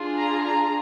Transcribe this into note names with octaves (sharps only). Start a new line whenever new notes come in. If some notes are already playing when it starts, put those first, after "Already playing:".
Already playing: D4 F4 G#4
A#5
A#5